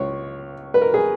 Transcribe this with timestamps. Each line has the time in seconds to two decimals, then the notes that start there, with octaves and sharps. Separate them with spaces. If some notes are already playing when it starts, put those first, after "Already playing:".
Already playing: C#2 C#3 C#5
0.74 B4
0.81 A#4
0.94 G#4